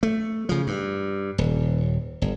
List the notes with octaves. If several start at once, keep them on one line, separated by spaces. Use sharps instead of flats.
A3
C#3 F3
G2
D#1
G1